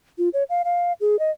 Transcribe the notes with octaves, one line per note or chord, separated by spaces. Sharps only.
F4
C#5
F5
F5
G#4
D#5